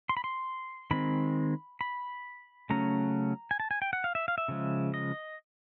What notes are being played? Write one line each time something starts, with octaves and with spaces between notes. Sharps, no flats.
C6
B5
C6
D#3 G#3 C4 B5
B5
C#3 F#3 A3 C#4 A#5
G#5
A5
G#5
G5
F#5
F5
E5
F5
E5
C#3 F3 G#3
D#5